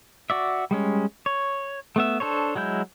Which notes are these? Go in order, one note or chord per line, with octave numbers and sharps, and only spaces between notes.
F#4 D5 E5
G3 G#3 C#4
C#5
A3 B3 E5
D4 A4 C5 C#5
F#3 G#3 E4 G6